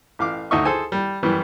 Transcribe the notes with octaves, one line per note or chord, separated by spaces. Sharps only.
A1 F5 D6
D2 D#4 F#4 D#5 E5 C#6
G#4 A4 C5 G#5
G3
F#2 E3 G3